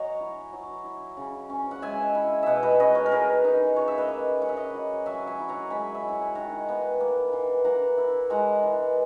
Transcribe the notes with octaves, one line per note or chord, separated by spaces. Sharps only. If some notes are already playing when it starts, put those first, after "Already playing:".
Already playing: F#3 C#5 D#5 F#5 G#5 A#5
E4
F#3
E4
C#3
C#4
F#5
G#3 E5 G#5
E4
B2 D#5 E5 F#5
B4 D#5
C#4 B4 D#5
A#4 C#5
A#4
E3 G#4 B4
D#4
C#3 A#4 C#5
E5
B4 D#5
A#3
C#4 F#5
E5
D#5 F#5
F#3
F#3 E5 G#5
E5 G#5
E4
F#5 A#5
G#3 G#5 B5
E5
E4
F#5
G#5
D#3 F#5 A#5
B3
A#3
E3
E3 F#5 A#5
E4
G#3 F#5 A#5
E3